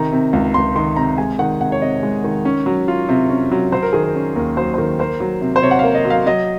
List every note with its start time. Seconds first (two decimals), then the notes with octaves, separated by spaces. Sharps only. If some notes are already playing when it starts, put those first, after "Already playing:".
Already playing: C3 D#3 A#5
0.12 C3
0.33 C#2
0.54 C#2 C6
0.76 D#3 C6
0.96 C3 A#5
1.18 G#3 G#5
1.39 D#3 F#5
1.61 C3 F#5
1.72 C#5
1.81 C3 D#5
2.03 G#3
2.24 D#3
2.45 C#4
2.66 F#3
2.88 F4
3.09 C3
3.29 C#4
3.51 F#3
3.72 F#3 C5
3.83 A#4
3.93 D#3 G#4
4.03 A#4
4.15 C#4
4.35 D#2 A#4
4.57 F#3 C5
4.74 C5
4.78 D#3 A#4
4.99 A#3 C5
5.20 F#3
5.41 C3
5.56 C5
5.62 C3 C#5
5.71 F#5
5.79 A#3 F5
5.95 D#5
6.05 F#3
6.10 F5
6.26 F#3 D#5